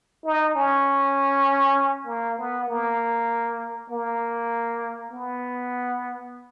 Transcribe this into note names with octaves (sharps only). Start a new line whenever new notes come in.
D#4
C#4
A#3
B3
A#3
A#3
B3